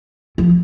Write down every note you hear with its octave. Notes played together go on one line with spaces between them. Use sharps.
F3